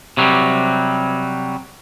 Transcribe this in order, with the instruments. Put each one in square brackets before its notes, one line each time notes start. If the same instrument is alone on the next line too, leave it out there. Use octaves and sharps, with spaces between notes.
[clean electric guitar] C3 F#3 G3